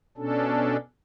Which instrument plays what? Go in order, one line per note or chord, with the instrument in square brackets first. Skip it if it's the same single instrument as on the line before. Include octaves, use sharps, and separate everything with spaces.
[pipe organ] B2 C#4 D4 A4